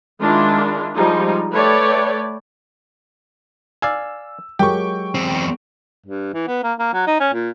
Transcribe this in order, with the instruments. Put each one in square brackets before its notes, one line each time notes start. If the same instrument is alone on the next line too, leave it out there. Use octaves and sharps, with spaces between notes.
[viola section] D#3 G#3 D4 E4 F4
F3 G3 G#3 D#4
A3 B4 C#5 D5 G5
[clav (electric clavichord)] D5 F5 G#5 [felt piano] E6
[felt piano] F#3 G#3 A#4 [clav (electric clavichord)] G4 [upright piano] G5 C#6
[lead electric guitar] E2 C4
[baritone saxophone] G2
E3
B3
A#3
A#3
F#3
D#4
C#4
A#2